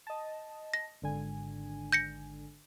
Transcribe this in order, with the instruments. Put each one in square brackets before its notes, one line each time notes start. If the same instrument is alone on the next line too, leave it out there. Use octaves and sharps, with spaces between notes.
[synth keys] D#5 A5
[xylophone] A#6
[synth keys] G#1 D3 G#5
[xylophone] G6 A#6 C#7